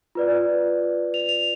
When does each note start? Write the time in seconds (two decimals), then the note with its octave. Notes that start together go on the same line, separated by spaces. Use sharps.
0.15 F4 B4 D5
1.14 F7
1.29 F7